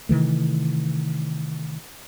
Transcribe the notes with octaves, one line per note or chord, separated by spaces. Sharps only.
C3 D#3 E3 A3